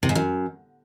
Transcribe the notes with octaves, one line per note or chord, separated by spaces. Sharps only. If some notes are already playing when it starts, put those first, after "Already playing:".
C3
G#2
F#2